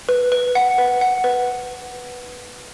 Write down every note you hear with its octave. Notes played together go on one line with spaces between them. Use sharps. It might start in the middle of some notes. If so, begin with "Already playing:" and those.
B4
B4
F#5
B4
F#5
B4